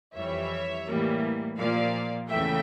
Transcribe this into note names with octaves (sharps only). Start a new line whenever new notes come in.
F2 E3 G3 C#5 E5
A2 E3 G3 A#3
A#2 F3 A#3 D5 F5
E2 C#3 E3 A3 E5 G5